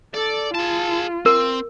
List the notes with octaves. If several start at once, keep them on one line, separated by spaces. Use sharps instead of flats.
A4 D5
F4 G#4 A5
C4 A#4